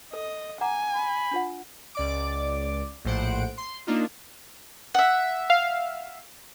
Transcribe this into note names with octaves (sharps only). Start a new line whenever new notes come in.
A4 D#5
F#5 G#5 A#5 D6
B5
D4 F4 F#5
C#2 D5 D6
A#1 A2 C5 F#5 D7
C6
A#3 D4 D#4 F4
E5 F#5
F5